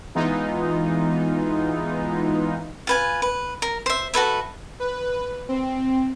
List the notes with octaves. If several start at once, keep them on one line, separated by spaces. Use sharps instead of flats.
E3 G#3 B3 D#4 F4
F4 B4 G#5
B4
A#4
C5 E5
F#4 A4 B4 E5
B4
C4